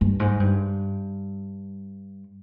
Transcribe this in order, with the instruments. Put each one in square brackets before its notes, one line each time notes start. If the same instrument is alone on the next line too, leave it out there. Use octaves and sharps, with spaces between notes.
[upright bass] G2
G#2
G2